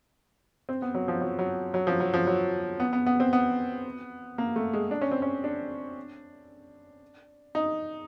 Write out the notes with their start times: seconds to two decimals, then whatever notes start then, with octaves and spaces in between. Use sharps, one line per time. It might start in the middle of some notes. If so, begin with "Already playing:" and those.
0.69 C4
0.82 B3
0.95 F#3
1.08 F3
1.21 F#3
1.39 F#3
1.74 F#3
1.87 F3
2.00 F#3
2.14 F3
2.27 F#3
2.80 B3
2.93 B3
3.06 B3
3.20 C4
3.33 B3
4.38 A#3
4.56 A3
4.73 G#3
4.91 D4
5.01 C#4
5.11 C4
5.22 C#4
5.44 D4
7.55 D#4